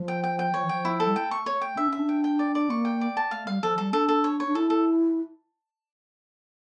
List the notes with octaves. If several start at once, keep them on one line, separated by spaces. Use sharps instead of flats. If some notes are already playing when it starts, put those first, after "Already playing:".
Already playing: F3
G5
G5
G5
F3 C#5
E3
F3 G5
E4
A4
G3
A3 G5
C#6
C#5
G5
D4 E5
C#4 E5
D4
G5
G5
D5
D5
A#3 C#6
G5
D5
A5
A3 F5
G3 F5
F3 A4
G3 A4
D4 A4
A4
C#5
C#5
D4
E4 A4
A4